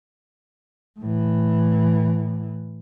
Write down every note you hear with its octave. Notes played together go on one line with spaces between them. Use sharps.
A2 E3